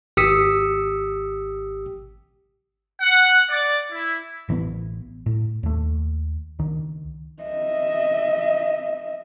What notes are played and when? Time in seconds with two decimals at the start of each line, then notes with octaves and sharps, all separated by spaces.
0.17 G#1 G4 D#6 E6 B6 C#7
3.01 F#5
3.49 D5
3.91 E4
4.49 A1 E3 F3 B3
5.26 A2
5.63 D#2 A3
6.59 C#2 D#3
7.43 D#5 E5